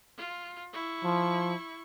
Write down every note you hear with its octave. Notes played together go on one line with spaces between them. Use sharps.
F4
E4 C#6
F3